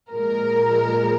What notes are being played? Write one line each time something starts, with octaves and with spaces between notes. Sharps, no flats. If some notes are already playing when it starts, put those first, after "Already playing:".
A#2 F3 G#3 A#4